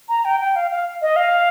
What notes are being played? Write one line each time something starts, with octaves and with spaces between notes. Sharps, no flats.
A#5
G5
G5
F5
F5
D#5
F5